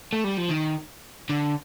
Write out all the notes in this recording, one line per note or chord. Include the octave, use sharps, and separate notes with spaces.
A3
G3
F3
D#3
D3